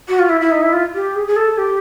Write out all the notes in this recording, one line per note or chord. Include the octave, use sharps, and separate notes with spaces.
F#4
F4
E4
E4
D#4
E4
F4
G4
G#4
G#4
A4
G4